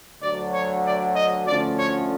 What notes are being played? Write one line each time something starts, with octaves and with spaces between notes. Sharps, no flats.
D2 D3 F#3 D5
C#5
D5
D#5
D2 D3 F3 A3 C#4 D5
C#5